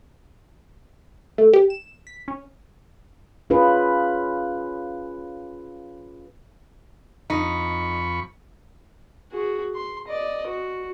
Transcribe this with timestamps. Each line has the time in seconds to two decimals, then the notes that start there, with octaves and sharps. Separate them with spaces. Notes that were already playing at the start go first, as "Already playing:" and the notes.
1.38 A3
1.53 G4
1.70 E7
2.07 B6
2.28 C#4
3.50 C#4 F4 G#4 B4
7.30 F2 D#4 B5 C#6
9.32 F#4 G#4
9.75 C6
10.08 D5 D#5
10.46 F#4